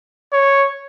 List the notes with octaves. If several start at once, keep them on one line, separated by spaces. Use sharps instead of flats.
C#5